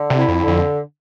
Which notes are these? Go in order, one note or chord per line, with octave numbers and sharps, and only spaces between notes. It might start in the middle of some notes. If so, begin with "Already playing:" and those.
Already playing: D3
C3
E4
F2
D3
F2